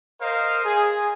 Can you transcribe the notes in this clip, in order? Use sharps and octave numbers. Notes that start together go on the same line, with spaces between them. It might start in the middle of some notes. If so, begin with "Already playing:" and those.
A#4 C5 D#5 F5
G#4